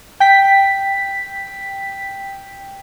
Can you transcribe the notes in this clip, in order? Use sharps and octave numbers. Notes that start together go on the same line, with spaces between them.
G5 B6